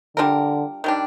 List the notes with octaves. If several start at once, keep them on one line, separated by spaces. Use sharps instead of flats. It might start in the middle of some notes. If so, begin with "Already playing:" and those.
D3 G3 D4 F4 A#4
D#3 G3 D4